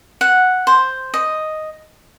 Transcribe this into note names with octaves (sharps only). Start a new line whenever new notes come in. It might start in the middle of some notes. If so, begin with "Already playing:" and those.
F#5
C5
D#5